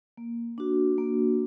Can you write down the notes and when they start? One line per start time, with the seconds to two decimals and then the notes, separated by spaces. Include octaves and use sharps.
0.17 A#3
0.58 D4 F#4
0.98 A#3